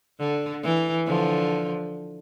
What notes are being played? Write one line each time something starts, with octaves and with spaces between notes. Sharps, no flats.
D3
E3
D3 F3